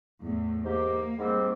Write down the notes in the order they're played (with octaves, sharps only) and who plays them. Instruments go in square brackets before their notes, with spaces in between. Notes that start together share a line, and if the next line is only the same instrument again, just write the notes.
[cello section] E2 A2
[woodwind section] G#2 G4 [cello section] A#3
[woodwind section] G#2 G3 C4